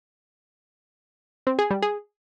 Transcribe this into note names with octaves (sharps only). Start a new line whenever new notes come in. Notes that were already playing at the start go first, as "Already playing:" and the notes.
C4
G#4
G3
G#4